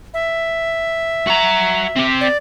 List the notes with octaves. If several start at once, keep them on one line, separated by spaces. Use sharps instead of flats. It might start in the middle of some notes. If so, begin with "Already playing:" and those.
E5
F#4 A#5
C4 G4
D5